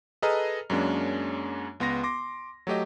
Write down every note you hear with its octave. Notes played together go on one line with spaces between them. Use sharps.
G#4 A4 B4 D#5 A#5 F6
F#2 F#3 G#3 A#3 C#4 D4
C#2 B3 C6 A#6
C6 D6 A#6
F#3 A3 G4 D#5